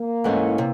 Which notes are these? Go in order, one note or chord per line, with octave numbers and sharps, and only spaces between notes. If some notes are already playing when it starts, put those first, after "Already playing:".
Already playing: A#3
G#2 E3 A3 C#4
C3